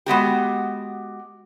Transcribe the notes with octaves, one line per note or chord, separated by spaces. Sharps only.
G#3 B3 F#4 G4